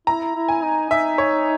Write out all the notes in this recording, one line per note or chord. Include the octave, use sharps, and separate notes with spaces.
E4 A#5
E4
G#5
D#4
D#4 E5
C#5